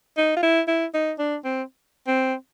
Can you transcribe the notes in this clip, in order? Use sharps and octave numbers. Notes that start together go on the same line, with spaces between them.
D#4
F4
E4
E4
D#4
D4
C4
C4